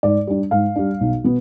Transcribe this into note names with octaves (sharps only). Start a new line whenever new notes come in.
G#2 D5
G3 D4
G#2 F5
G3 D4
B1
B2 B3